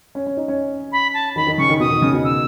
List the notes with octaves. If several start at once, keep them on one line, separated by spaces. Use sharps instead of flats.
C#4
C#4
D#4
C#4
B5
A5
D#3 B5
D#3
C#3 C#6
D#3
B2 D#6
D#3
C#3
B2
E6